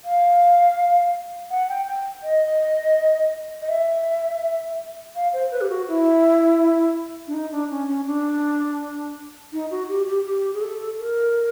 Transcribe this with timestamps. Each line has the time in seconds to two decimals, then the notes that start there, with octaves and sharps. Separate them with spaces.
0.04 F5
1.50 F#5
1.69 G5
1.88 G5
2.23 D#5
3.62 D#5
3.69 E5
5.16 F5
5.33 C5
5.52 B4
5.61 G4
5.69 F#4
5.88 E4
7.28 D4
7.34 D#4
7.52 D4
7.71 C#4
7.88 C#4
8.06 D4
9.53 D#4
9.71 F#4
9.89 G4
10.07 G4
10.25 G4
10.54 G#4
10.61 A4
10.99 A#4